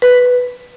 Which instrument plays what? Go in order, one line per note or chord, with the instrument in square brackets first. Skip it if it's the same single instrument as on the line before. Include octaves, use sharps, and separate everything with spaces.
[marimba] B4